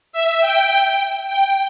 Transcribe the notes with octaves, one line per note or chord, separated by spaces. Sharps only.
E5
G5
G5